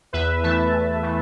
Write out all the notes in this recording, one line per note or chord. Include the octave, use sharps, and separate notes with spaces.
E2 B4 E5
E3 A3 E5 A5
E2
E3 A3